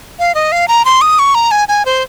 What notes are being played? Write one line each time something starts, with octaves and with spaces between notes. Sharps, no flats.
F5
D#5
F5
A#5
C6
D#6
C#6
A#5
G#5
G#5
C5